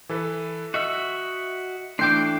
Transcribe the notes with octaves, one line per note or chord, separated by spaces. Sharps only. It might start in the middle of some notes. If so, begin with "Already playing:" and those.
E3 A4 B4
F#4 D#5 E5 E6
E3 A3 D4 G5 C6 D6 G6 C7